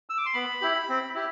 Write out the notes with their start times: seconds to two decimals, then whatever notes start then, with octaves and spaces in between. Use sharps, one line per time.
0.10 E6
0.18 D6
0.26 C6
0.34 B3 B5
0.61 E4 G4
0.89 C4
1.15 E4 G4